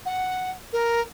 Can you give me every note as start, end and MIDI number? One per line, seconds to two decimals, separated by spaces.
0.05 0.51 78
0.73 1.01 70